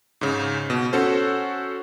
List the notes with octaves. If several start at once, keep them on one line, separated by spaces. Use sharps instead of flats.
G#2 C#3
B2
C#4 F#4 A4 C5